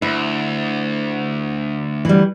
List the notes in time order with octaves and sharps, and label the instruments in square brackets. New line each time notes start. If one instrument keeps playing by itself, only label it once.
[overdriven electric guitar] D2 [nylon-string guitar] E4
[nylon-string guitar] E3 G3